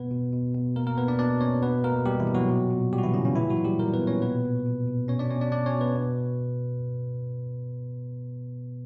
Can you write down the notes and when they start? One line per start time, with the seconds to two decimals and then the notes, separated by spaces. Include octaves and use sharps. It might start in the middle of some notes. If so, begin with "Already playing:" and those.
Already playing: B2 B3 B4
0.11 B2
0.33 B2
0.55 B2
0.76 B2 A#3 A#4
0.87 A#3 A#4
0.97 B2 B3 B4
1.08 D4 D5
1.19 B2 D4 D5
1.41 B2 C#4 C#5
1.62 B2 B3 B4
1.84 B2 A#3 A#4
2.06 B2 G3 G4
2.20 E3 E4
2.27 B2
2.34 F#3 F#4
2.49 A#2
2.70 A#2
2.93 A#2 G3 G4
2.98 F#4
3.03 E3 E4
3.14 A#2 C#3 C#4
3.25 C#3 C#4
3.36 A#2 E3 E4
3.50 F#3 F#4
3.57 A#2
3.64 G3 G4
3.79 A#2 A#3 A#4
3.94 B3 B4
4.01 A#2
4.07 C#4 C#5
4.22 B2 B3 B4
4.44 B2
4.66 B2
4.87 B2
5.08 B2 C#4 C#5
5.19 D4 D5
5.30 B2 C#4 C#5
5.41 D4 D5
5.52 B2 D4 D5
5.66 C#4 C#5
5.74 B2
5.81 B3 B4
5.96 B2